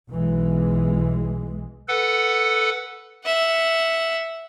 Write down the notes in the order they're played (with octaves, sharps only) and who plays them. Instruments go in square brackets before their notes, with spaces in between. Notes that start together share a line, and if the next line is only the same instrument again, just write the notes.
[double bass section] B1 E3 G#3
[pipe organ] A4 B4 F#5
[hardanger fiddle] E5 F#5